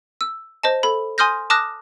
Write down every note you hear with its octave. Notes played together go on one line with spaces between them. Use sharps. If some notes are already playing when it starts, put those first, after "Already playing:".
E6
C5 D#5 A5
A4 B5
G#5 C6 D#6 F6 G6 A#6
A5 D6 D#6 F6 F#6 A#6